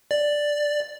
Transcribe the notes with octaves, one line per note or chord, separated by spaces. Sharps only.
D5